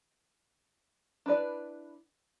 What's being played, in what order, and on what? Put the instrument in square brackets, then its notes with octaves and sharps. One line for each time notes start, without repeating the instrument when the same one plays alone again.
[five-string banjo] D4 E4 B4 D5